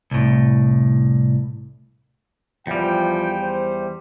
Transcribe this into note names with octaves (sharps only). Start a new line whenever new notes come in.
C2 A2
E2 F3 G3 G5
C5